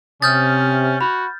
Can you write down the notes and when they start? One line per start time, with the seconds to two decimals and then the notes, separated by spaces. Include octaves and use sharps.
0.22 C3 C#4 D#6 F6 G6 A6
1.01 F#4 B5